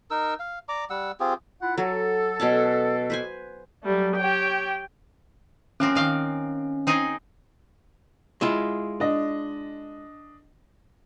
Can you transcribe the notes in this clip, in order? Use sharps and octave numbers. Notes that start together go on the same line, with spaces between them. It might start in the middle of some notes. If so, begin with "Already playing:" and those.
D#4 A#4 E6
F5
D5 A#5 D6
G3 F#5 E6
C4 F4 G4 G#4
E4 F4 F#5
F#3 A4
B2 C#4 A5
B4 C5 G#5
F#3 G3 A3
G4 C#5 G5
F3 A#3 C4 C#4
D#3 F5 G5
C4 D#4 G#4
G#3 E4 F4
D4 D#5